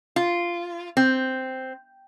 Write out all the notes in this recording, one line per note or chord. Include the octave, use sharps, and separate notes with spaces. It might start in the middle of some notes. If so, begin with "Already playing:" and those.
F4
C4